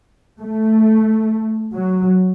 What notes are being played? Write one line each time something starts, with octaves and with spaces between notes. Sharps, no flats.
A3
F#3